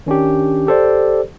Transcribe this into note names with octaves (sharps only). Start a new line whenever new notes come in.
D#3 C#4 D4 G4
G4 A4 C5 D5